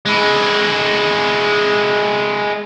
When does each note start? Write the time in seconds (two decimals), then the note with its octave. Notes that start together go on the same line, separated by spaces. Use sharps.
0.06 G#3 E4